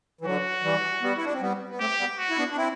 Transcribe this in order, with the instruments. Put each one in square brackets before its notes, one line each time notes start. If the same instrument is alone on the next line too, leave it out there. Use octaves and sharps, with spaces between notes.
[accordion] E3
[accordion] D3 F#3 [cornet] F#4
[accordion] E3 G3
G3 B3
E4
D4
C4
G3 B3
B3
[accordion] A3 C4 [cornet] G4
[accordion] G3 B3
[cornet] F#4
[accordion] E4
B3 D4
D4
C4 E4